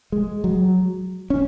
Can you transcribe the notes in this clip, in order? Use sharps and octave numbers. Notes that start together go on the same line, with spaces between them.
G#3
F#3
C#4